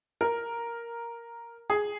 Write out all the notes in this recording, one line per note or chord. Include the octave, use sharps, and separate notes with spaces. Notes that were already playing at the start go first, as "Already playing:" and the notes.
A#4
G#4